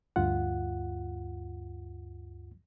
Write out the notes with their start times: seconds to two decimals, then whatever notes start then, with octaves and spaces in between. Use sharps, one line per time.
0.16 D2 G2 F4 F#5